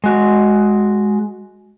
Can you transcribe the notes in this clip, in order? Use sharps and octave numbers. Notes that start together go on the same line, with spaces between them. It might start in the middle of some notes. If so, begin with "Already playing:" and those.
G#3 F#4